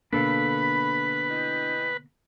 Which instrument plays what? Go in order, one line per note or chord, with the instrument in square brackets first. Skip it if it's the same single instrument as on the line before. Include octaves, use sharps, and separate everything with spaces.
[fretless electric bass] B2 D3 A#3 [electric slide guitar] D4 A4 F5 [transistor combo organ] B4 [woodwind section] B5
[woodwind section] E4 D#5 G5